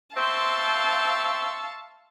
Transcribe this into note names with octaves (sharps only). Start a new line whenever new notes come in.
C4 E5 F5 A5 C6 C#6 E6